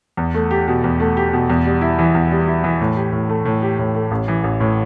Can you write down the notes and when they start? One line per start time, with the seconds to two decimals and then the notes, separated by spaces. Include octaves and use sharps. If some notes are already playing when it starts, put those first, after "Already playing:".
0.17 E2
0.34 A3
0.51 G4
0.68 B2
0.84 E2
1.00 A3
1.17 G4
1.33 B2
1.50 E2
1.66 G3
1.81 E4
1.99 E3
2.14 E2
2.31 G3
2.47 E4
2.64 E3
2.81 A2
2.96 G4
3.12 A2
3.29 A3
3.45 A2
3.62 G4
3.79 A2
3.94 A3
4.11 A1
4.28 E3
4.43 A1
4.60 A2